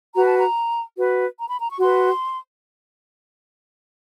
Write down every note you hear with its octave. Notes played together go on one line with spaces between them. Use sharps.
F#4 B4 A#5
A5
A#5
F#4 B4
A#5
B5
A#5
C#6
F#4 B4 C6